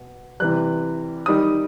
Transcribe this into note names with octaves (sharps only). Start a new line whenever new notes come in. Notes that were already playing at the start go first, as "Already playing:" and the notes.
Already playing: B2
C3 E3 G3 F#6
D#3 G3 D#4 D#6